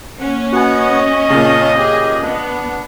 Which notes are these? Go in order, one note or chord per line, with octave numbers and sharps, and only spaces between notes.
A#3 C#4 F#5
B3 F#4 D#5 F#5 G#5
A#2 C#3 F5 A5
G4 G#4
B3 D4